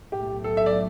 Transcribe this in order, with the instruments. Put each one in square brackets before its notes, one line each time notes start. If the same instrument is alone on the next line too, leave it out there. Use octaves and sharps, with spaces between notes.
[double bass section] B1 A2 A3 [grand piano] G4
[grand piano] A4
E5
D5